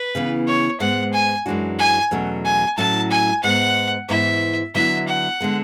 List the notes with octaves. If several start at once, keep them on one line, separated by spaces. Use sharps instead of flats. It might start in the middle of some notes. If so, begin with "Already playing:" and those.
Already playing: B4
C#3 E3 B3
C#5
G#2 G#3 B3 F#5
G#5
F#2 E3 G#3 D4 F#4
G#5
E2 B2 F#3 A3 C#4
G#5
A2 F#3 A3 C#4 A5
G#5
G#2 G#3 B3 F#5
G#2 E3 B3 E4 E5
D3 F#3 B3 E4 E5
F#5
D3 G#3 B3